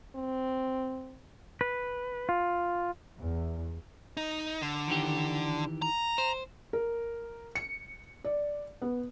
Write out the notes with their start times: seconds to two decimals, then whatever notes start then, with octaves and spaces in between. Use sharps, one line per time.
0.16 C4
1.61 B4
2.29 F4
3.18 E2
4.17 D#4
4.61 D3
4.88 D#3 E3 G4
5.82 A#5
6.18 C5
6.73 A#4
7.55 C#7
8.25 D5
8.82 B3